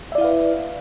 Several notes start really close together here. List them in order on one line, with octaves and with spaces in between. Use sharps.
E5 D5 E4 F5 B4